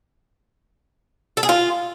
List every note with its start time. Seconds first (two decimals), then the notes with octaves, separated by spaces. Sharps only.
1.37 A4
1.43 G#4
1.49 F4